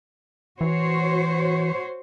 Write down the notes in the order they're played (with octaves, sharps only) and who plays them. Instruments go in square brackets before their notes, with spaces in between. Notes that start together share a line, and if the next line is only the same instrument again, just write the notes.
[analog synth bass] E3 [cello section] F#4 C5 C#5